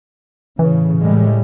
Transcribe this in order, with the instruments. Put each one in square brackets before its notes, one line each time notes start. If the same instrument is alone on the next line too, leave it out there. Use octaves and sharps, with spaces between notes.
[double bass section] A2 C#3 [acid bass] E3
[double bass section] A2 G3 G#3